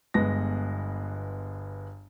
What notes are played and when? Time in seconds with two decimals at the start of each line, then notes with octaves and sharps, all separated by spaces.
0.14 G1 G#3 B3 A#6